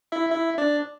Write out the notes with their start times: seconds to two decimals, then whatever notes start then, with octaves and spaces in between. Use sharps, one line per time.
0.12 E4 E5
0.31 E4 E5
0.58 D4 D5